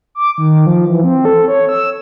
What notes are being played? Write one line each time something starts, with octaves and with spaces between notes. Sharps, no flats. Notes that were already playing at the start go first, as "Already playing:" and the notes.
D6
D#3
F3
E3
C4
A4
C#5
E6